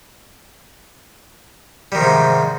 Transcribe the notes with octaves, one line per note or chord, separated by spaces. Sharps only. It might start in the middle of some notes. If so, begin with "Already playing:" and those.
G#2 C3 D#3 F3 G3